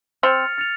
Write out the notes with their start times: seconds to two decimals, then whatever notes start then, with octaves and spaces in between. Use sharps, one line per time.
0.23 C4 F6 A6 C#7 F7
0.58 F6 A6 C#7 F7